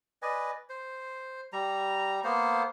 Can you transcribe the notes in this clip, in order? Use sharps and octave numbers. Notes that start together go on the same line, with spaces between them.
B4 D5 D#5 G#5
C5
G3 A#5
A#3 B3 C5